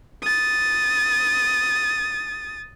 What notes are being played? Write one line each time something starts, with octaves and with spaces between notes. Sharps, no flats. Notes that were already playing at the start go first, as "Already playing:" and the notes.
D#6 A6